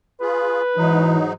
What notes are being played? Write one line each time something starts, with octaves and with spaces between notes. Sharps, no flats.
F4 G#4 B4
G#2 E3 F#3 D#4